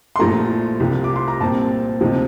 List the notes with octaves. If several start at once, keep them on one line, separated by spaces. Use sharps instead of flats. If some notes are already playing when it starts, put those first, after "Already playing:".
C6
A#1 A2 F3 A3 A#5
C2 C3 F3
D6
C6
A#5
A#1 A#2 G3 C4 A5
D2 C3 F3 C4 D#4